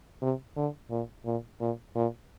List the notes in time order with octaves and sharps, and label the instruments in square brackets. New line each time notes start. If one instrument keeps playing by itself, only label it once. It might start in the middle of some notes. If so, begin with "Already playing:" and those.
[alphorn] C3
D3
A#2
A#2
A#2
A#2